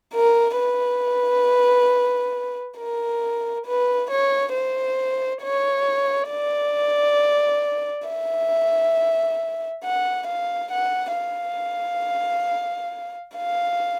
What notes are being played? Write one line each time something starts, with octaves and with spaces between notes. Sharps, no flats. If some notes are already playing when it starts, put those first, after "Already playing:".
A#4
B4
A#4
B4
C#5
C5
C#5
D5
E5
F#5
F5
F#5
F5
F5